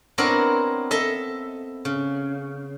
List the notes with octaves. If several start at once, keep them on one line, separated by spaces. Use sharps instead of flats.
B3 C4 D4 E4 A#4 C#5
A4 D#5 E5
C#3